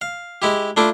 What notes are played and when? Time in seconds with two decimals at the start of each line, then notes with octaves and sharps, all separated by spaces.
0.01 F5
0.42 G#3 E4 G4
0.77 A3 D4 E4 F4 D6